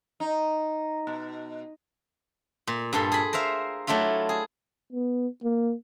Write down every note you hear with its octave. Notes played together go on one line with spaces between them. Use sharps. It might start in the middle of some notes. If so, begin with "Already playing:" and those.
D#4
B2
A#2
G2 A#2 A4 C6
G#4 B5
A#4 C5 E5 F5
F#3 A3 D4 E4 F4
G#4
B3
A#3